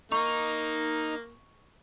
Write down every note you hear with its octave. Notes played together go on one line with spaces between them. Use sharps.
A#3 D#4 C#6